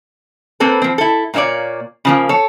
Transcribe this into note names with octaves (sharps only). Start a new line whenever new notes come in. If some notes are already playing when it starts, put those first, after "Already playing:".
A#3 C4 A4 B4
F3 C4
E4 A4
A#2 A#3 E4 C#5 D5
C#3 F3 A#3
A4 C#5